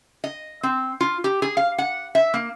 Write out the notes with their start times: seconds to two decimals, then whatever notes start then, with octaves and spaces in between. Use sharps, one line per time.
0.24 D#5
0.63 C4
1.01 F4
1.24 G4
1.42 G#4
1.57 F5
1.78 F#5
2.15 E5
2.34 A#3